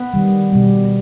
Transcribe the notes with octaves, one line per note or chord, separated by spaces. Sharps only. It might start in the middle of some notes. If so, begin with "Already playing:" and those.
Already playing: B3 B4
D#3 G3
B2 G3